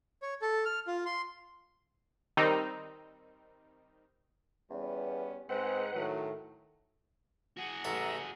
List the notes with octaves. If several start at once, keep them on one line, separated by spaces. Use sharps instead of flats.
C#5
A4
F6
F4
C6
D#3 G3 C4 D#4
E2 G3 B3 C#4
G#2 G#3 C4 B4 F#5
A2 D#3 F#3
F#4 G#4 F#5
A1 A4 E5 A#5